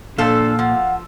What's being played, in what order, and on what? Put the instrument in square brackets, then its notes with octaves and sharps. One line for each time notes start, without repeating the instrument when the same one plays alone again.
[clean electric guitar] A#2 [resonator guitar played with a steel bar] F3 A4 [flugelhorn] D4 [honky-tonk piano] F5 E6
[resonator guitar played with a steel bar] F3 [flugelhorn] F#5